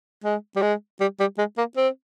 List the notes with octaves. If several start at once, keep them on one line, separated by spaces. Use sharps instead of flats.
G#3
G3
G#3
G3
G3
G#3
A#3
C4